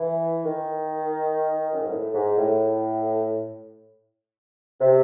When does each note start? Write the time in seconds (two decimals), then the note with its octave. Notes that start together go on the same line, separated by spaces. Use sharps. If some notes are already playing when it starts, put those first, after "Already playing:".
Already playing: E3
0.44 D#3
1.73 F#2
1.81 G#2
1.90 A2
2.13 G#2
2.37 A2
4.81 C3